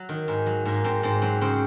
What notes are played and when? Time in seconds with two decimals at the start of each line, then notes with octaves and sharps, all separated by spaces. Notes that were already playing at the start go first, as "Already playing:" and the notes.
Already playing: F#3
0.09 D#3
0.28 G#2
0.46 F#3
0.65 G#2 A#3
0.84 G#2 C4
1.03 G#2 C4
1.22 F#3 C4
1.41 C#3 C4